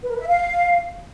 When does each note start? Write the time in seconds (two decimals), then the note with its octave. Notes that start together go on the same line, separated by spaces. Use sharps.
0.03 B4
0.09 A#4
0.15 B4
0.21 E5
0.27 F5